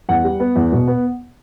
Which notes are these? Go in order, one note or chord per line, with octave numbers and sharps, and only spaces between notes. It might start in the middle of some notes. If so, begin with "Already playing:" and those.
E2 F#5
G3
B3
E2
B2
B3